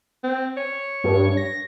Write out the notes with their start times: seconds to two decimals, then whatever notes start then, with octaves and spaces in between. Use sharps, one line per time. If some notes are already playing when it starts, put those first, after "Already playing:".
0.24 C4
0.57 C#5
1.04 G2
1.37 A#6